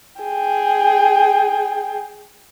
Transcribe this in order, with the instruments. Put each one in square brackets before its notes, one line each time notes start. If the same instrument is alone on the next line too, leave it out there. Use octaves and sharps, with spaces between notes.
[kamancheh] G#4 G5